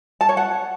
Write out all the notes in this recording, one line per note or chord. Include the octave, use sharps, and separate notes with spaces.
A5
C#5
F#5